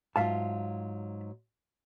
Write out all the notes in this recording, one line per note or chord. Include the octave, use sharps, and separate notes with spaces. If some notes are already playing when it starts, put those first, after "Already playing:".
G#2 F#3 F4 E5 F5 A5